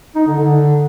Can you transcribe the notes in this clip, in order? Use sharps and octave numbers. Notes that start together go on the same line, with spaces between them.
D#4
D3
D3